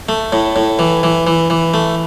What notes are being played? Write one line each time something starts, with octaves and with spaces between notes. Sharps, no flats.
A3
A2
A2
E3
E3
E3
E3
A3